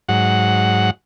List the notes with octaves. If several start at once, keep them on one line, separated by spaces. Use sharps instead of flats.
G#2 F#3 F#5